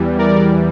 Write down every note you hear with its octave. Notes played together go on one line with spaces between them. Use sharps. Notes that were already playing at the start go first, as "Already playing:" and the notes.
Already playing: E2 E3 G3
A#4 D5